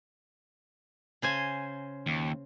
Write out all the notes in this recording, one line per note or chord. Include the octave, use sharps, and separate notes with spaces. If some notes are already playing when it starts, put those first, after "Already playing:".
C#3 C5 G#5
D#2